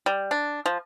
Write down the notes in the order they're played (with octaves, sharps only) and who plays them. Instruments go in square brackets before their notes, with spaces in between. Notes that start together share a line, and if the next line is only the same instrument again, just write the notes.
[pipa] G3
D4
F3